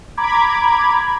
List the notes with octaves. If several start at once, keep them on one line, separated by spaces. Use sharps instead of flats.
A#5 B5 D6 G#6